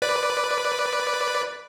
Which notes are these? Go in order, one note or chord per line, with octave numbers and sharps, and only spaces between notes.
B4 D5